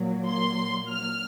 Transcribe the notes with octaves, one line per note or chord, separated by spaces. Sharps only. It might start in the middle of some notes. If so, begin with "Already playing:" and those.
Already playing: A#2 F#3 A#3
C6
F6